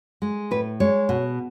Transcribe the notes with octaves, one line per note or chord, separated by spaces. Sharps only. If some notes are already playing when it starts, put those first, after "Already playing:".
G#3
A2 B4
G#3 C#5
B2